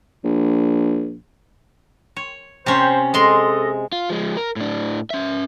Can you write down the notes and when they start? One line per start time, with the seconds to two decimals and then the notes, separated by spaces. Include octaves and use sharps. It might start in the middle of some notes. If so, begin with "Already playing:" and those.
0.24 A#1
2.16 C#5
2.66 C3 C#4 C5
3.14 G#3 A4 D#5 C6
3.92 F4
4.10 F3 G#3
4.37 A#4
4.56 A2 D4
5.10 C#4 E5